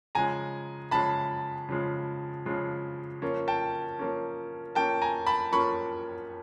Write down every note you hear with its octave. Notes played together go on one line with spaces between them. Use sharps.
C#3 F3 G#3 G#5 A#5
C#3 F3 G#3 A5 B5
C#3 F3 G#3
C#3 F3 G#3
F3 A#3 C#4
G5 A5
F3 A#3 C#4
F3 A#3 C#4 G5 A5
G#5 A#5
A5 B5
F3 A#3 C#4 B5 C#6